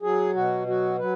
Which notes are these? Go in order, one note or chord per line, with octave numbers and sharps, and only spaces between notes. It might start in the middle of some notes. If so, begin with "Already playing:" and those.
F#3 G#4
B2 F#4
F#3 F#4
F#3 B4